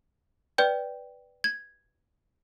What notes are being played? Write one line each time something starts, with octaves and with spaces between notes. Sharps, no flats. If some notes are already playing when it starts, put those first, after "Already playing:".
B4 D5 G5 G6
G#6